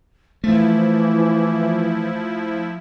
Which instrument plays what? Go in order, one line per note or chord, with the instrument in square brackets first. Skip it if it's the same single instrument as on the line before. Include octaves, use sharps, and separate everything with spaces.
[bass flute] E3 [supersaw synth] F3 E4 [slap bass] A3